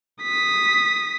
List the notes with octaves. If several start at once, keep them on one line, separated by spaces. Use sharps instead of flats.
D#6 B6